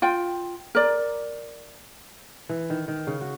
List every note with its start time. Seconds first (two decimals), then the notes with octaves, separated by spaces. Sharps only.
0.02 F4 G5
0.75 A#4 D5
2.49 E3
2.70 D#3
2.88 D#3
3.07 C#3
3.21 F#4